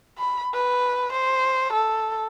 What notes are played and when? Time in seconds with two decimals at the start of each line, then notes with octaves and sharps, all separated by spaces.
0.18 B5
0.54 B4
1.13 C5
1.73 A4